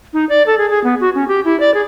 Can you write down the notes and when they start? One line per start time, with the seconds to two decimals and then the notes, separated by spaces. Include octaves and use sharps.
0.13 D#4
0.29 D5
0.46 A4
0.58 G#4
0.70 G#4
0.84 B3
1.00 F#4
1.15 C#4
1.28 G4
1.45 E4
1.60 D5
1.74 G#4